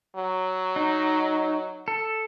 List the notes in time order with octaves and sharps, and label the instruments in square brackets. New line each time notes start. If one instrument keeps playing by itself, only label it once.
[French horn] F#3
[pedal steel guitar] D#4
A4